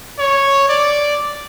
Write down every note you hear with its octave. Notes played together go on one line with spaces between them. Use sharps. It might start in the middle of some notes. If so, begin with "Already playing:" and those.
C#5
D5